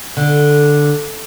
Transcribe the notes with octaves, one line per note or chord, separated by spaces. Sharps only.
D3